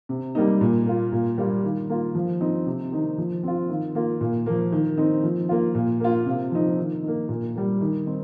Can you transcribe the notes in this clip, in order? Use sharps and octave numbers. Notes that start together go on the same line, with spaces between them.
C3
G3 A#3 D#4
A#2
A#3 F4
A#2
G3 A#3 F4
D#3
A#3 F4
F3
C4 D#4
C3
D#3 C4 D#4
F3
C4 F4
D#3
A#3 F4
A#2
F3 A#3
D#3
C4 D#4
F3
A#3 F4
A#2
A#3 F4
C3
F3 C4 D#4
D#3
A#3 D#4
A#2
G3 A#3
D#3
C4 D#4